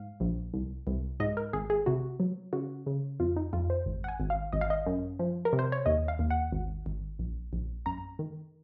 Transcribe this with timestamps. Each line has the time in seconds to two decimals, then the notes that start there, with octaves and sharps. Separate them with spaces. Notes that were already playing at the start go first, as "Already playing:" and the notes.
Already playing: G#2 F5
0.20 A#1
0.53 C2
0.87 C2
1.20 G#2 D#5
1.37 A#4
1.53 G#1 G#4
1.70 G#4
1.86 C3 F#4
2.20 F#3
2.53 C#3 F#4
2.87 C#3
3.20 F2 F4
3.37 D#4
3.53 F2 F4
3.70 C5
3.86 G#1
4.04 F#5
4.08 G#5
4.20 G#1
4.30 F5
4.53 G#1 D#5
4.61 F5
4.70 D#5
4.86 F#2
5.19 F3
5.45 A#4
5.53 C3
5.59 C5
5.72 C#5
5.86 D#2 D#5
6.08 F5
6.19 D#2
6.31 F#5
6.52 G#1
6.86 G#1
7.19 A#1
7.53 A#1
7.86 F#2 A#5
8.19 D#3